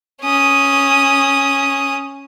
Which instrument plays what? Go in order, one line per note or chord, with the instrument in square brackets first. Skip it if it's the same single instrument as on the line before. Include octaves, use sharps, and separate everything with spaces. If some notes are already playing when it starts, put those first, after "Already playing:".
[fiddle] C#4 D#6